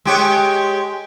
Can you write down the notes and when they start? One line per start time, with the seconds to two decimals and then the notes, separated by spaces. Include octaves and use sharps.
0.05 G#3 G4 C#5